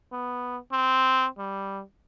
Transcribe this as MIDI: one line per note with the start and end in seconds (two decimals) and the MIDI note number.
0.12 0.57 59
0.72 1.27 60
1.38 1.82 55